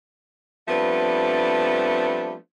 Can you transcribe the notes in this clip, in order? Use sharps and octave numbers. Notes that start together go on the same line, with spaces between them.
F3 G3 A3 B3 C4 D4